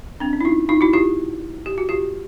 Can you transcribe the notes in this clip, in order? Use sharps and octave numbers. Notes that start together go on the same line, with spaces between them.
C4 D4
C#4
E4
D#4 F4
D#4 F4
E4 F#4
F4 G4
G4
F#4
F4 G4